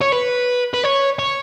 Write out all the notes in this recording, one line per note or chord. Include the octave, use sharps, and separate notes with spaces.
C#5
B4
B4
C#5
C#5